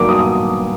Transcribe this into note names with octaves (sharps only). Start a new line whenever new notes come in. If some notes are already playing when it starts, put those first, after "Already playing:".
Already playing: G2 D#3 F#3 A#3 D6
D#6
D#6